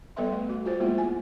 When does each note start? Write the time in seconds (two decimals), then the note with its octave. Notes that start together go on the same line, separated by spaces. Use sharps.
0.16 G3 B3 A4 B4 E5 C6
0.32 A3
0.49 F#4
0.65 F4 F#4 G#4 C5
0.80 F#3 G#3 A#3 B3 E4 F4
0.98 G#5